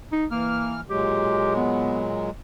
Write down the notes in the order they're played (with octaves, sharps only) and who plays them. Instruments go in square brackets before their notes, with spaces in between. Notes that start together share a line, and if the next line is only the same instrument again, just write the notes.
[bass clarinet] D#4
[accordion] E3 F6 [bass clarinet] A#3
[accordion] A#2 F#3 G#3 [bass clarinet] G4
[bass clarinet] B3